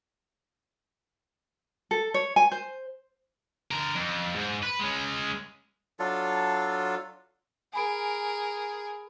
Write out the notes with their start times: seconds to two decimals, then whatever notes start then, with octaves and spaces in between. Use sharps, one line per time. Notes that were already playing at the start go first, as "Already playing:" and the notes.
1.91 A4
2.14 C#5
2.36 G#5
2.52 C5
3.71 D3 A#4
3.95 F2
4.36 G#2
4.63 B4
4.80 G#3 C#4
5.99 F#3 D4 F4 A4
7.73 G#4 A#4 G#5 B5 D7